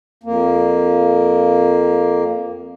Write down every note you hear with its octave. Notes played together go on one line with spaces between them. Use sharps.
F2 A#3